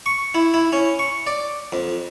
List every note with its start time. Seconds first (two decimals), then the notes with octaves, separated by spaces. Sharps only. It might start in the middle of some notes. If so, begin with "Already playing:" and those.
0.06 C#6
0.34 E4
0.54 E4
0.73 C#4
0.99 C#6
1.27 D5
1.72 F2